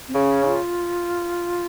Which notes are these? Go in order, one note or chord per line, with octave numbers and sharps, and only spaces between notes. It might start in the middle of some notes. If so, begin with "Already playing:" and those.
C4
C#3 C#4
F4